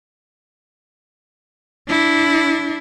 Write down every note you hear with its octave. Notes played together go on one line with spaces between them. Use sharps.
D4 E4